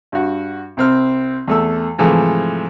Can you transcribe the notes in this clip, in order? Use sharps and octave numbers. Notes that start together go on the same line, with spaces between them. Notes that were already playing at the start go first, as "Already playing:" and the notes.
G2 F#4
C2 C4 F6
E2 A3 E6
G#2 C3 E3 F3 A3